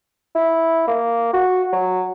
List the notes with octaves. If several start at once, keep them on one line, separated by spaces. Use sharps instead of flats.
E4
A#3
F#4
F#3